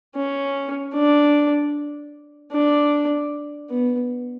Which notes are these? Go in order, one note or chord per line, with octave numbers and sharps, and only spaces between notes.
C#4
D4
D4
B3